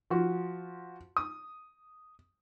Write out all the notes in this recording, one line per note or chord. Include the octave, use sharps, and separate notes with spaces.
F3 F4 F#4
D#6